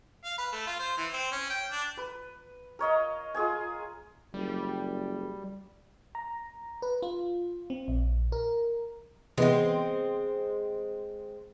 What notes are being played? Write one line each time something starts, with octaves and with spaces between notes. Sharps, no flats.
F5
B4
A3
F4
C5
E3
C4
C#4
G5
D4
B4
A#4 C#5 D#5 F5
F4 G#4 D#5 G#5
F#1 G3
A#5
B4
F4
C4
A#1
A#4
C3 E3 G#3 B3 C4